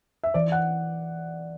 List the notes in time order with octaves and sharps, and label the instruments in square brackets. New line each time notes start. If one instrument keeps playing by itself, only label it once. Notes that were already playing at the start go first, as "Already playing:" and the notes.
[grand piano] E5
[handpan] E3 [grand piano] D5
[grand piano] F#5